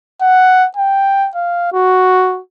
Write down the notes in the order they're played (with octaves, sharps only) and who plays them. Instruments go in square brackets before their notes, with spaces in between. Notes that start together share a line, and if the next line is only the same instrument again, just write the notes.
[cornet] F#5
G5
F5
F#4